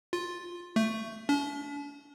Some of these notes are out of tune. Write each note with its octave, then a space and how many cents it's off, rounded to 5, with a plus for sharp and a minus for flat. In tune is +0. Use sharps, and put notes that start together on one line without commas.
F4 +10
A3 +15
D4 -45